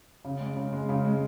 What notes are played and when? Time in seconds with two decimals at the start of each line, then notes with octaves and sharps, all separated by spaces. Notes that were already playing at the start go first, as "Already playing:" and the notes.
0.25 C#3
0.40 G#3
0.56 C#3
0.73 G#3
0.89 C#3
1.05 G#3